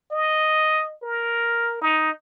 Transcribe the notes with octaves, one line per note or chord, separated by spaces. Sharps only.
D#5
A#4
D#4